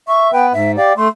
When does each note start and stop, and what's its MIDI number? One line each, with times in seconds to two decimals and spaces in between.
0.08 0.31 76
0.08 0.31 85
0.33 0.53 59
0.33 0.53 71
0.33 0.47 79
0.53 0.76 44
0.53 0.72 76
0.77 0.93 67
0.77 0.93 74
0.77 0.95 77
0.97 1.08 57
0.97 1.09 84